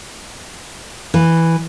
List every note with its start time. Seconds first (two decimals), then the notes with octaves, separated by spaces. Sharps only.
1.14 E3